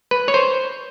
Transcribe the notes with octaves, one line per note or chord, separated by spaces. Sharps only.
B4
C#5
C5